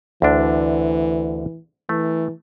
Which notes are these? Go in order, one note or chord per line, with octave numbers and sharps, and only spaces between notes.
D2 D3 E3 D4
E3 A3